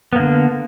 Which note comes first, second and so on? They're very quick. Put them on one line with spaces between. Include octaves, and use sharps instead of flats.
B3 A#3 D3